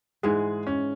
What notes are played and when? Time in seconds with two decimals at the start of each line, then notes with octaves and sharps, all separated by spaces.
0.23 G#2 E3 G#3 G#4
0.67 C#4